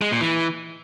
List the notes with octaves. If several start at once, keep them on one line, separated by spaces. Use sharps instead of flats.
G#3
A#2
E3